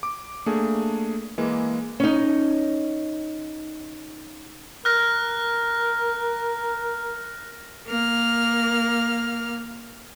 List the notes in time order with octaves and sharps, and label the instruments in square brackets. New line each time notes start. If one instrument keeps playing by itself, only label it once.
[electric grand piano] D6
A3 A#3 D4 G#4
E3 G#3 A#3
[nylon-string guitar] C#4 D#4
[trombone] A#4 [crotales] F6 F#6 A#6
[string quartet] A#3 F6